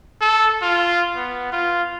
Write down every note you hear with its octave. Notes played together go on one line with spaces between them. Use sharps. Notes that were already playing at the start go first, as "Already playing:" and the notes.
A4
F4
B3
F4